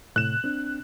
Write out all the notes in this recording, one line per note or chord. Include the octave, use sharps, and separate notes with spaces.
A2 C3 F#6 E7
C4 D4